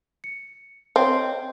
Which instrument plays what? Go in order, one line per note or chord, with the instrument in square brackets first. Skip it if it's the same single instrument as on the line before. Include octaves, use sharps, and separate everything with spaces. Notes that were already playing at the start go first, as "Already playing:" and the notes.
[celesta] C#7
[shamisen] C4 [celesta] C#5 D#5 G5